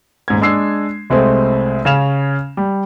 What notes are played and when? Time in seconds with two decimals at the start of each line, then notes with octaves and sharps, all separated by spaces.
0.28 D#1 G#2 G#6
0.41 G#3 D4 E6 C7
1.10 C2 G#3 A3 C4
1.85 C#3 C#4 F5 E7 F7
2.57 G3